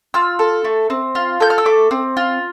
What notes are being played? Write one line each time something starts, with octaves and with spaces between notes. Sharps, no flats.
F4 E6
A4
A3
C4
F4
A4 G6
F6
E6
A3 D6
C4
F4